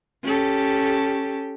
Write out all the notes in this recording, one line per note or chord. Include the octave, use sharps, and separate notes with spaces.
C#4 G4 A4